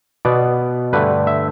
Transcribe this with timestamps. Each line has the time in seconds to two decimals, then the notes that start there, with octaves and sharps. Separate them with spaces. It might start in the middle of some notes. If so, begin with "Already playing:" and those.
0.25 B2 B3 D5
0.93 G2 D3 A3 B4
1.27 E5